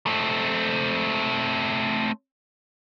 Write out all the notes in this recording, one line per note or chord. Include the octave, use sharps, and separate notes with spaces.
A3 C4